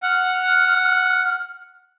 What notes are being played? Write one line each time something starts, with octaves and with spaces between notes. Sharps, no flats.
F#5 F6